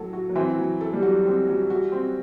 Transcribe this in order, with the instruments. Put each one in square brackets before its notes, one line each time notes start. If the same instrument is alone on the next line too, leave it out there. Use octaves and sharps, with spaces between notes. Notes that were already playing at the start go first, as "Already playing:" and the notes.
Already playing: [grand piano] A2 [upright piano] F#3 A4
[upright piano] F#4
[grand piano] F#3
[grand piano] E3 [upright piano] C4
[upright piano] F#3
A4
[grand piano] G3
[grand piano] F#3 [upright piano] F#4
[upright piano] C4
F#3
F#4
C4